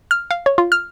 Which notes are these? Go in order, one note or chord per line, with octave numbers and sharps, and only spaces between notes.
F6
F5
C#5
F4
F6